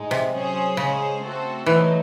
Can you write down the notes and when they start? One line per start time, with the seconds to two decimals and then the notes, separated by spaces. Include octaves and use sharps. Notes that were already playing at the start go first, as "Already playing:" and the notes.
Already playing: A2 G#3 D#4
0.11 C3
0.33 F#3 C#4 G#4 C5
0.77 C#3 G#3 C#4 G#4 C5
1.22 A3 C4 F#4 A4 C5
1.66 E3 F#3 A3 D#4